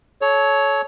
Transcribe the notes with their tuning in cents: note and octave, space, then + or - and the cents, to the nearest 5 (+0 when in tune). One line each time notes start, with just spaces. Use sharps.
A4 -30 C#5 +10